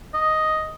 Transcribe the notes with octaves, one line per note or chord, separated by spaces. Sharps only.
D#5